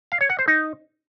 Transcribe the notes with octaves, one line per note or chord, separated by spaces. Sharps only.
F5
C#5
F#5
C5
D#4